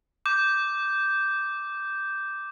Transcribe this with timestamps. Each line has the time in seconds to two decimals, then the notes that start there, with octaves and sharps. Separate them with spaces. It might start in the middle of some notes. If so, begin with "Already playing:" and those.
0.26 D6 G6